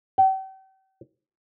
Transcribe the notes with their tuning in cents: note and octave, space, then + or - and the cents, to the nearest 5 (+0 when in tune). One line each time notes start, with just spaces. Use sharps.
G5 -40